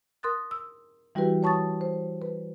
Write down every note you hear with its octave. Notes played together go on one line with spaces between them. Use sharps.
A#4 C6 D#6 F#6 A6
E6
E3 G3 E4 F#4 G4 B4
C#5 A5 C#6 D#6 A6
C5
B4